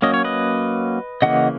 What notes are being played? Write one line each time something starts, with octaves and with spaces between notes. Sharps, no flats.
F#3 A#3 C#4 D#5
C#5
B4 D#5
C#3 E3 A#3 D#5 F#5